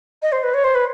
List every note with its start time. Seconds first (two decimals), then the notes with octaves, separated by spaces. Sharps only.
0.22 D#5
0.32 C5
0.43 B4
0.53 C#5
0.64 C5
0.74 B4